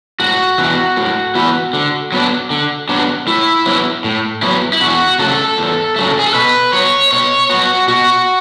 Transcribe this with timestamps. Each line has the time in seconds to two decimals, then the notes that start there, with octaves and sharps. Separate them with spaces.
0.20 A2 F#4
0.58 E3 B3 E4
0.96 A2
1.35 E3 B3 E4
1.73 D3
2.12 F#3 B3 D4
2.50 D3
2.89 F#3 B3 D4
3.27 A2 E4
3.66 F#3 B3 E4
4.04 A2
4.42 F#3 B3 E4
4.73 E4
4.81 E2 F#4
5.19 C#3 F#3 A3 A4
5.58 E2
5.96 C#3 F#3 A3
6.19 G#4
6.27 A4
6.34 B2 B4
6.73 F#3 B3 C#5
7.11 B2 C#5
7.50 F#3 B3 F#4
7.88 B2 F#4